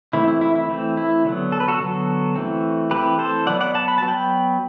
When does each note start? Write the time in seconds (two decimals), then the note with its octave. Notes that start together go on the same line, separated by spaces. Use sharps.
0.13 E3 A3 C4 E4
0.28 E4
0.41 E4
0.55 E4
0.69 E3 A3 C4
0.97 E4
1.25 D3 F#3 B3
1.52 A4
1.60 B4
1.68 F#4 A4
1.80 D3 F#3 B3
2.36 E3 A3 C4
2.91 E3 A3 C4 G4 B4
3.19 A4 C5
3.46 F#3 B3 D5 F#5
3.61 D5 F#5
3.74 F#5 A5
3.88 B5
3.98 F#3 B3 A5
4.08 G5 B5